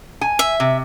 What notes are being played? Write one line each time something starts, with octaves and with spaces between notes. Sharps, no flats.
G#5
E5
C3